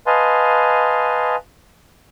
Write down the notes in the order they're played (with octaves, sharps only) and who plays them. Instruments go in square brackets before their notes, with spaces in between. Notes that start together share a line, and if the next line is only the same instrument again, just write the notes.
[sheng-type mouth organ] B4 D#5 F5 G#5 A5 C6